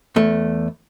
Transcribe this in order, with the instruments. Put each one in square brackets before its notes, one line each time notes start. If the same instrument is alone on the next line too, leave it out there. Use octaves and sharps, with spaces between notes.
[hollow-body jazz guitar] E2 A3